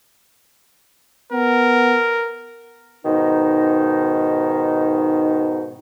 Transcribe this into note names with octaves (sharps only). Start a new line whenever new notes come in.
B3 A#4
G#2 B2 D#3 D#4